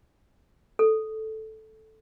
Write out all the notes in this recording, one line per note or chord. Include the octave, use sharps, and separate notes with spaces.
A4